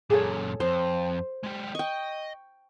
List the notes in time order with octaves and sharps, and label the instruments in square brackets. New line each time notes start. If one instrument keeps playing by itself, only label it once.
[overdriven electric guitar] F#2 A#2 [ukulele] G#4 A4 C#5
[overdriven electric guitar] F2 [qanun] C5
[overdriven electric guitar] G#3 G4
[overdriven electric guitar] D#5 [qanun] G5 C#6